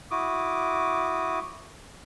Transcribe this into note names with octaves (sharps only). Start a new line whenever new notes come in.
E4 F#4 D6 D#6